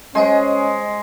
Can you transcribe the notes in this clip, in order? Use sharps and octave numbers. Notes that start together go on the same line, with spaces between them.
G#3 C#4 C5 D#5 C6